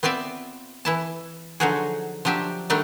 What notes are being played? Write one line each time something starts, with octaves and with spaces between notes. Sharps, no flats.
B3 C4 F4 D5 E5
E3 E4 A5
D3 F3 F#3 D#4 F#4 G#4
F3 F#3 D4 G4 E5
D#3 F#3 G3 A3 D4 D#4